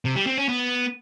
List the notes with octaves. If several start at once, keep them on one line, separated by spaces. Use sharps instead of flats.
C3
G3
C4
C#4
B3